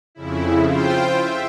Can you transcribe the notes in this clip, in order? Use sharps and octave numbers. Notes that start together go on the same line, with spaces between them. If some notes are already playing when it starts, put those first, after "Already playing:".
F2 C#3 E4
F4 C5 G5
E5